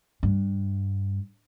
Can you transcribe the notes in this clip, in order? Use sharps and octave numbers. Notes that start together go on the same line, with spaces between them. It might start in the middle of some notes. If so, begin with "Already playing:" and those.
G2